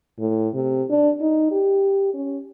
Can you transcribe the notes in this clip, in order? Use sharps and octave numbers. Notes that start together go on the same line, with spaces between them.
A2
C3
D4
D#4
G4
C#4